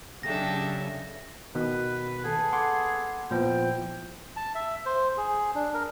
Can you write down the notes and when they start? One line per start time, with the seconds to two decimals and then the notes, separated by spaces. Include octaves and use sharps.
0.23 C#3 F#3 D4 D#4 G4 A4 E5 A#6
1.55 B2 D#3 B4
2.24 B3 G#4 A4
2.53 F#5 C6 D6
3.31 A#2 F3 B3 E4 G5
4.36 A5
4.55 E5
4.86 C5
5.17 G#4
5.55 D4
5.74 A#4